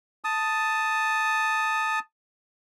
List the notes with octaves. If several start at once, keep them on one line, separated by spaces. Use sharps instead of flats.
A5 D#6